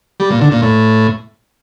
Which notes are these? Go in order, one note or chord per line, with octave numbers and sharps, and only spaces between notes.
G3
A#2
D3
A#2
A2